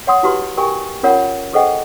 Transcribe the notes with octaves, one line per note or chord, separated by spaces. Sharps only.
C#5 F#5 C6 D#6
E4 F#4 G4 B4 C6
G4 A#4 G5 G#5 C#6
C#4 F4 A#4 C#5 F#5
G#4 A4 C5 D#5 F#5 G5